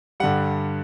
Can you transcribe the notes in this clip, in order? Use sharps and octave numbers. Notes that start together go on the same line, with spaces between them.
G2 D3 G3 F#5